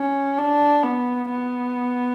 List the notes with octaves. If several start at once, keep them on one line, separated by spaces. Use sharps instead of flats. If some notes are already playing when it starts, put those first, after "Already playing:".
Already playing: C#4
D4
B3
B3